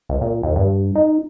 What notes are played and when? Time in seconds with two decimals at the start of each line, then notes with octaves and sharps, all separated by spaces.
0.09 C#2
0.21 A#2
0.43 D#2
0.56 G2
0.95 D#4